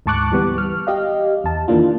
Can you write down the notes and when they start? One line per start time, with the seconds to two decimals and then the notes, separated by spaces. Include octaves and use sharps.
0.06 D2 G#2 A5 C#6 D6 F#6
0.32 E3 G3 B3
0.58 F6
0.87 G4 D#5 F5
1.44 E2 A5
1.68 D#3 E3 A#3 D4 F4